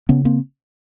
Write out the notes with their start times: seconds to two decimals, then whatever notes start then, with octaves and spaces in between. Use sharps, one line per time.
0.09 C#3 B3 C#4
0.25 A#3 C4